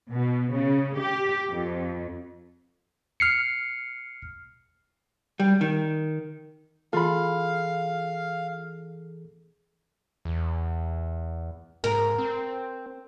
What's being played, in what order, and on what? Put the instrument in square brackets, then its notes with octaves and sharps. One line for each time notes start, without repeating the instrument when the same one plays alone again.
[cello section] B2
C#3
G4
F2
[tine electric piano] F6 C7 C#7
[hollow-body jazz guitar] G3
D#3
[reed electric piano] E3 G#4 A4 [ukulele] F4 B5 [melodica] F5
[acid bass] E2
[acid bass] G#2 [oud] A#4
[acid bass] C4